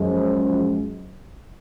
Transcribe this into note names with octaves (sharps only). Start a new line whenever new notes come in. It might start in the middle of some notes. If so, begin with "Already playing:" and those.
Already playing: F#2 F3 G#3